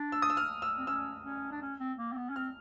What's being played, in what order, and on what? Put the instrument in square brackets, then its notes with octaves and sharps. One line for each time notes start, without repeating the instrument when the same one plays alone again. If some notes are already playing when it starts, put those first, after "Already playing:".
Already playing: [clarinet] D4
[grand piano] E6
D#6
E6
F6
E6
[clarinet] C4
[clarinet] C#4 [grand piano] E6
[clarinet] C#4
D4
C#4
C4
A#3
C4
B3
C#4
[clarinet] C4 [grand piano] F6